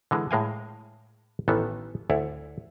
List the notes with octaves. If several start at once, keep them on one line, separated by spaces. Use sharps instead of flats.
D3 E3 G#3
A2 G#3 A#4 F5 G5 G#5
A1 D#3 E3 B3 A4
D2 E4 C#5 D5